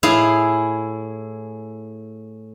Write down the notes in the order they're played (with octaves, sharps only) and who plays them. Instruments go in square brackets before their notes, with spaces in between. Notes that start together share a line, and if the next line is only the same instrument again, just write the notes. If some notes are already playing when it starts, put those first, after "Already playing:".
[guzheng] A2 E4 G#4 F5